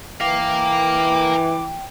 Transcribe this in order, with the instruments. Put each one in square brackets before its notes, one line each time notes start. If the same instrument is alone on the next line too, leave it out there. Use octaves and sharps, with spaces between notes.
[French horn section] E3 [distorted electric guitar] A#4 F5 [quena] G5 [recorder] D6